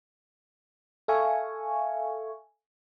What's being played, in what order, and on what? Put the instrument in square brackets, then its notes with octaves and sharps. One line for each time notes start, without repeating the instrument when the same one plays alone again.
[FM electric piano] A4 E5 F5 G#5 C#6